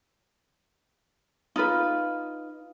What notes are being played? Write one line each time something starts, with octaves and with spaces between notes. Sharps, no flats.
D#4 F4 B4